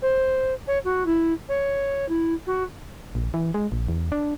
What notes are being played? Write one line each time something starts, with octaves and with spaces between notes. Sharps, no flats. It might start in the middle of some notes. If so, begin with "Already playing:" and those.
C5
C#5
F#4
E4
C#5
E4
F#4
A#1
E3
G#3
A#1
E2
D4